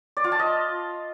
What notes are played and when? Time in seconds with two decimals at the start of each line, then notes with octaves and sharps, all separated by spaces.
0.17 D5
0.24 F4
0.32 A5
0.39 D#5